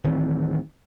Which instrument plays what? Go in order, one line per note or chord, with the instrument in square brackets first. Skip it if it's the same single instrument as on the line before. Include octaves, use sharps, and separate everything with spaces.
[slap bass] D1 D#3 E3 C4